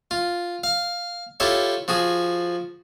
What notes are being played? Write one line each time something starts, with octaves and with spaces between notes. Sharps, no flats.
F4
F5
E4 F4 G4 A4 C#5
F3 F#4 G#4